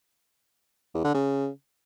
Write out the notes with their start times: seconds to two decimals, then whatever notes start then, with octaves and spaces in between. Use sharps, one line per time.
0.94 E2
1.04 D3
1.15 C#3